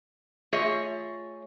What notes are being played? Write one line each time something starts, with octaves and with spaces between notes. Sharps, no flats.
A3 F4 G#4 C#5 D#5 E5